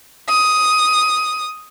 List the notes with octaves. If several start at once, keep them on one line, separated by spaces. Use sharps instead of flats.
D#6